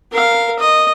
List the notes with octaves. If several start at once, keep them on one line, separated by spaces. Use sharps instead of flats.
A#4 F5
D#5